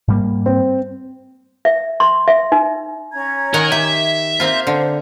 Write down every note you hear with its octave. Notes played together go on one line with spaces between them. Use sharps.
G#2 G3 A#3
C4
E5
C6
E5
D#4
C#4 A#5 G#6
D#3 A#4 F#5 G#5
G4 E5
A#3 C4 F4 C5
D3